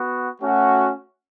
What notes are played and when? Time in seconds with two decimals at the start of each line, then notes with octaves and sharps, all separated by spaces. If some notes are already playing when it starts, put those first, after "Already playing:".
Already playing: B3 F#4
0.41 A3 C#4 F#4